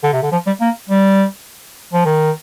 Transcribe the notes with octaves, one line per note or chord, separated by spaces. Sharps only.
D3
C3
D3
F3
G3
A#3
G3
F3
D#3